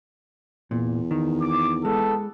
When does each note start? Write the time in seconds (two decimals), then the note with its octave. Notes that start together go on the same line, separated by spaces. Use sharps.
0.71 E2 A#2
1.11 D#3
1.42 D6
1.85 G#3 B3 A4